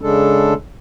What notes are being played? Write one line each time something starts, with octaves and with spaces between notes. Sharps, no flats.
C#3 G#3 D4 A4